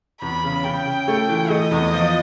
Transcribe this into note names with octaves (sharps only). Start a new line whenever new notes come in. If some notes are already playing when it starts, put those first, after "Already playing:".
E2 B5
C#3
C#3 G5
C#3
A3
E3
A3 D#5
E2
F3